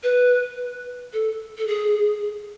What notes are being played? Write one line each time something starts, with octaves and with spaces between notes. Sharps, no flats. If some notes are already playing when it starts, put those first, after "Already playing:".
B4
A4
A4
G#4